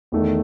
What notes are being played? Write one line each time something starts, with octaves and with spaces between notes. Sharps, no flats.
E2 D#3 A3